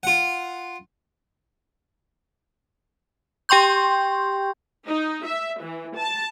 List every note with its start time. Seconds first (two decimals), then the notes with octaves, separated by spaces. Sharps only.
0.03 F4 F#5
3.49 G4 G5 C6 C#6 G6
4.88 D#4
5.26 E5
5.62 E3
5.96 A5